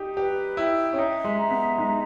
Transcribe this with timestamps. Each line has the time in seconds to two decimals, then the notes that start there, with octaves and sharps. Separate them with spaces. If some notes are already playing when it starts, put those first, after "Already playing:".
Already playing: D#4 G4
0.17 G4 B4
0.57 E4 G5
0.93 C#4
0.98 D#4 E5
1.24 G#3
1.38 A#5
1.50 B3
1.78 G#3 D#4